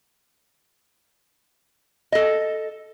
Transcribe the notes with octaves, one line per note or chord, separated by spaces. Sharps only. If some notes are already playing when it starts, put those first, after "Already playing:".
A4 D#5